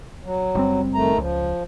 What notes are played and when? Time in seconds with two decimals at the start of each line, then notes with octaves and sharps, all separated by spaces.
0.24 F#3
0.55 F#1 G3 C4
0.94 D#3 A3 A#5
1.18 C#2 F3